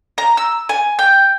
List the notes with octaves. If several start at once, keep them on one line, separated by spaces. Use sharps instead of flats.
A#5
E6
G#5
G5